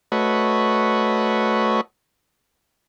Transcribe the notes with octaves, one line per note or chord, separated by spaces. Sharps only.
A3 F#4 B4 C#5 D#5